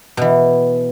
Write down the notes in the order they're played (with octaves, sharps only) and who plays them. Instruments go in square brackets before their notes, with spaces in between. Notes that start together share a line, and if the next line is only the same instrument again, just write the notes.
[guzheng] B2 E3